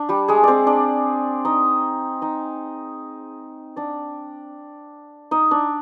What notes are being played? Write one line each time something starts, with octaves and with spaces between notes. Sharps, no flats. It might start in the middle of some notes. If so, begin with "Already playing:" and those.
Already playing: D4
G3 G4
G#3 G#4
C4 C5 D5
D4 D5
D#4 D#5
D#4 D#5
D4 D5
D#4 D#5
D4 D5